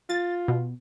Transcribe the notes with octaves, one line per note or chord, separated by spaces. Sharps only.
F4 A6
B2